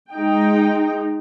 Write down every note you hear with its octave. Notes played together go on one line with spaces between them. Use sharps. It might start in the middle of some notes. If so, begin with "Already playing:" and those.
G#3 D#4 G5